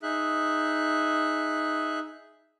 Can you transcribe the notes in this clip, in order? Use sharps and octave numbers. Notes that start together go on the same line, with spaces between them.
D#4 G#4 E5 F#6